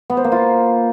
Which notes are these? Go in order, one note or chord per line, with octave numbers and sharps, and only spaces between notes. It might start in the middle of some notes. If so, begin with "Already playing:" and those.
B3
C5
A#3
F4